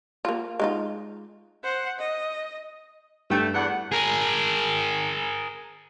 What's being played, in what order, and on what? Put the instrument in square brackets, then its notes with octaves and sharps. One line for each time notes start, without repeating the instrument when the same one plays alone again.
[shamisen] A#3 F4
G#3 D#4 F4
[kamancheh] C5 F#5
D#5
[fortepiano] G2 G5 [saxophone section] A3
[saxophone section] E2 D4 F#5
[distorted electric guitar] G#4 A#4